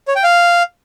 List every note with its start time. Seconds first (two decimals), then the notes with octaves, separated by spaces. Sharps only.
0.08 C#5
0.16 G5
0.23 F5